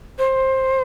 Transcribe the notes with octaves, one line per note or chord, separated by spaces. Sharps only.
C5